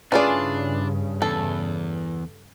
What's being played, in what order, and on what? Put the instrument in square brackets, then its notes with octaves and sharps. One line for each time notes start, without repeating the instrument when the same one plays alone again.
[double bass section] G2 C#3 [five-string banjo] E3 F4 D5 [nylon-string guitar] C#4 G#4 [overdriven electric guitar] D4
[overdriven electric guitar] E2 [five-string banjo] A4